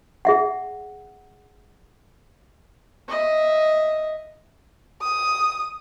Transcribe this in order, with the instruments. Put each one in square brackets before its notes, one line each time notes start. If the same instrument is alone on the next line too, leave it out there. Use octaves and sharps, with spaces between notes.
[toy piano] G#4 E5 F#5
[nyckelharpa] D#5 E5
[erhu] D#6